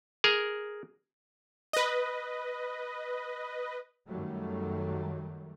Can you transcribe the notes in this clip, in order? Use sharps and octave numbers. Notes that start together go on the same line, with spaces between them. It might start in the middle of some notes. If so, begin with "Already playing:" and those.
G#4 A#4
B4 D#5
F#2 D#3 F#3 G3 A3